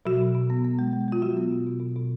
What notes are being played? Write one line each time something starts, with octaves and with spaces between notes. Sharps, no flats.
B2 F#3 F#4
B2
B2
B3
B3
G#3
G#3
G#3 F4
F#3 G#3 F#4
B3
B2
B2
B2
B2